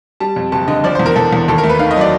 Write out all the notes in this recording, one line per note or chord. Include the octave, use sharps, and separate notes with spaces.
G3 A5
F2
F#1 A5
D3 D#5
F3 D5
E2 C5
A#4
E2 A4
E2
D#2 A4
A#4
A3
B4
D#3 F5
D#5
F#3 D5